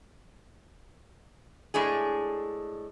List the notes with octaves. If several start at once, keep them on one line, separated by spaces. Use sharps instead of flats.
A2 G#3 D4 G#4